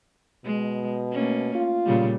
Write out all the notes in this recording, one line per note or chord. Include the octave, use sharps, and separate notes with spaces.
B2 G#3
A3 A#3 C#4
F4
A#2 C#3 G3